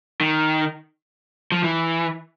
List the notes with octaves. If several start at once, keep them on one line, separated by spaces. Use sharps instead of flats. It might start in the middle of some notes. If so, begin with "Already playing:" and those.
D#3
F3
E3